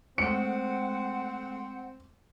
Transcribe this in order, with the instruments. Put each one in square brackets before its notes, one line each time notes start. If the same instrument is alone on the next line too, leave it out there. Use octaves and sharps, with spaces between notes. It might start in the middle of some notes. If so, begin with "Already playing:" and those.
[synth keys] G#3 A3 [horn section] C4 [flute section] F#5 [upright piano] C#7